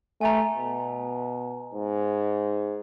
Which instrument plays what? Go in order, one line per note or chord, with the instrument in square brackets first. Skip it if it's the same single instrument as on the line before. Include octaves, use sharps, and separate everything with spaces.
[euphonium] A3 [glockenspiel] G#5 A#5
[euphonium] B2
G#2